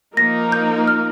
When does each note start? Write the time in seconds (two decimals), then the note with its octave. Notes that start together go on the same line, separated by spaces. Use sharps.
0.17 F3 A#3 D#4 A#4 A#6
0.52 G6
0.88 F6